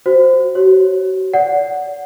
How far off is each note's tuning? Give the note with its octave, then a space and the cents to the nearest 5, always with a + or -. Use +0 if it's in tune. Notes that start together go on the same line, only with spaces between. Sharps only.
F#4 +0 C5 -5
F#4 +35 C#5 -15
D5 -25 F#5 +0